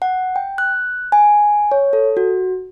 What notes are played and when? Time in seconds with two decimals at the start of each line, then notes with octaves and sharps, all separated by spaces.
0.02 F#5
0.36 G5
0.58 F#6
1.12 G#5
1.72 C#5
1.93 A4
2.17 F#4